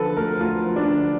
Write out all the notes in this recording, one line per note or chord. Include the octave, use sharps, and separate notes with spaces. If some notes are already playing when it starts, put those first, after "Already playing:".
Already playing: D3 F3 A4 B4
D2 A#4
D2 F4
F3
D4
D3